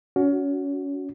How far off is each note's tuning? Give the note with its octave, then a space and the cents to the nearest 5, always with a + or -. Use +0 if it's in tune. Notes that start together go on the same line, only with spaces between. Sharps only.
C#4 +30 F#4 +0